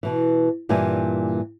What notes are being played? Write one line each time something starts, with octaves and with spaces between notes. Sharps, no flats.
B2 E3
G2 A#2 E3 G3 G#5